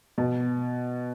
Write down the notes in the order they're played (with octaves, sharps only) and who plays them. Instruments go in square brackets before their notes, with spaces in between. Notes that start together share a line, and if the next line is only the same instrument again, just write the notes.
[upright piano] B2